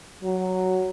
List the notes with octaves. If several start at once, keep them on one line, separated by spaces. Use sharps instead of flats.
F#3